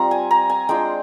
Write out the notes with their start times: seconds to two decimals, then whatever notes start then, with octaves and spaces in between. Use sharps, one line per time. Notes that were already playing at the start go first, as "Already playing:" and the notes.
Already playing: G3 C4 F4 A#5
0.11 G#5
0.31 A#5
0.50 G#5
0.69 G#3 D4 F4 G5